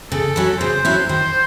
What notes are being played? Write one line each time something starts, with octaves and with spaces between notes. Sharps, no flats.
C#3 A4
F#3 C#4 E4
C#3 C5
F#3 C#4 E4
D#3 C5